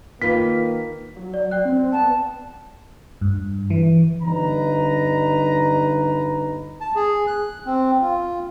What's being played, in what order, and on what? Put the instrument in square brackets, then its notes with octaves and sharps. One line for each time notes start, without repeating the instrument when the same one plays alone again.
[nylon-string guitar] D#3 F4 B4 [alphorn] A#3 [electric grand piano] B6
[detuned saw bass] F#3
[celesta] D5
D5 G5 F#6
[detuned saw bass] C4
[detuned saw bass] B3 [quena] A5
[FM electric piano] G2
E3
[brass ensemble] G1 D#4 B4 A#5
[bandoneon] A5
G#4
F#6
C4
F4